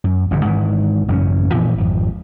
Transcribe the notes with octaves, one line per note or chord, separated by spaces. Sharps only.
F#2
A1 G2 D3
G#2 D#3 E3
A1 F#2 C#3 C#4
A#2 E3 F3 C4
G#1 F2